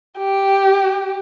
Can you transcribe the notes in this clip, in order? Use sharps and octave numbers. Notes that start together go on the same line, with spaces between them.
G4